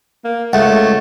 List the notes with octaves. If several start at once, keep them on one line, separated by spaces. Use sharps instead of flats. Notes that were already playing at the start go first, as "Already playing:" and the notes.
A#3
C#2 A3 F#5